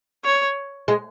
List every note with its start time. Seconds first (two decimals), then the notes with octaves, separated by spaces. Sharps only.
0.25 C#5
0.88 G#3